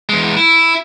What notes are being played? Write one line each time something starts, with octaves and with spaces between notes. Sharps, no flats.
E2 G#3
E4